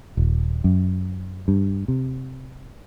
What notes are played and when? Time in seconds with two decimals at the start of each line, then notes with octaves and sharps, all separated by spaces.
0.17 D#1
0.64 F#2
1.48 G2
1.88 C3